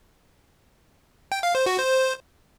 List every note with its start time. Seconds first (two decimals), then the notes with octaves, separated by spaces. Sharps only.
1.32 G5
1.43 F5
1.55 C5
1.66 F#4
1.78 C5